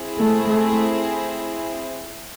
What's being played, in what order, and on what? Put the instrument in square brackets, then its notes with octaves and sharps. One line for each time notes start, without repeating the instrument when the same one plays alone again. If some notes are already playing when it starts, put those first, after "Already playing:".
Already playing: [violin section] C4 E4 G#4
[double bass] A3
A3